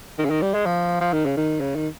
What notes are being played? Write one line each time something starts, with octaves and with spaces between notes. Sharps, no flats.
D#3
C#3
D#3
G3
G#3
F3
F3
D#3
C#3
D#3
C#3
D#3